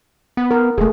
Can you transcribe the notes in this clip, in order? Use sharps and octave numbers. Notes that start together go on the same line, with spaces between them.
B3
A#4
E1 A3 G#4